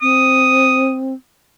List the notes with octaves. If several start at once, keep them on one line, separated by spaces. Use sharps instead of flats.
C4 D#6